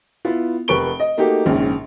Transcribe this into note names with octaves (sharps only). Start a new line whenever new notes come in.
B3 E4 F4
F1 A#4 B4 C#6 D7 G7
D#5
A3 A#3 D#4 F#4 G4
A#1 D#2 G#2 C#3